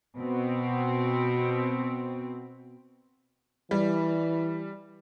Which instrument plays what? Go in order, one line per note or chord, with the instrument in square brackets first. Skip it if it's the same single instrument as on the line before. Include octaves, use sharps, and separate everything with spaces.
[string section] B2 C4
[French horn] E3 [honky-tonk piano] G3